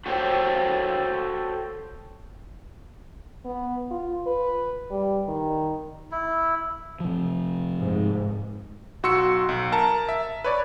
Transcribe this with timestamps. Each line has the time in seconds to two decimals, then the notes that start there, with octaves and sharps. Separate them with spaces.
0.06 F#4 G4 A4 C5 C#5 G5
3.45 B3
3.91 F4
4.27 B4
4.91 G3
5.28 D#3
6.12 E4
7.00 C3 F3
7.82 G#2
9.03 B1 F#4 C6 E6 C#7
9.49 B1
9.72 A#4 A5 A#5
10.09 E5
10.44 B4 C#5 D5